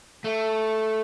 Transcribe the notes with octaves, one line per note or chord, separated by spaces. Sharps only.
A3